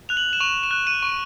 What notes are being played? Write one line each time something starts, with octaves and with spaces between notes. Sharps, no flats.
F#6 F7
F#7
E7
C#6 F7
E7
F#6
D#7
C#6